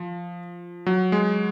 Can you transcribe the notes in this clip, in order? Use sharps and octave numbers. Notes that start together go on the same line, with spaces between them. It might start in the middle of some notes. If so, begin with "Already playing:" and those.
Already playing: F3
F#3
G#3